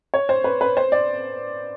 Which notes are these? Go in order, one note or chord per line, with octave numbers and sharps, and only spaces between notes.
C#5
C5
B4
B4
C5
D5